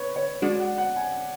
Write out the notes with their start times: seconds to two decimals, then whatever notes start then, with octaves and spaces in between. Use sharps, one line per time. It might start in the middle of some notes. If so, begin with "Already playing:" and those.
Already playing: B4 C#5
0.16 C#5
0.42 G#3 D4 F#4 D5
0.60 F#5
0.78 F#5
0.96 G#5